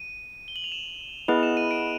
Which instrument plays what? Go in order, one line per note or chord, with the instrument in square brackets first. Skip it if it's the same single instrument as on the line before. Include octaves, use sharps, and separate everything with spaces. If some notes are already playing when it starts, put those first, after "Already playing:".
Already playing: [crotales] D#7
G7
F#7
F7
E7
[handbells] B3 E4 G#4 B4 D#5 [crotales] F7
[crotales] E7
D#7
D7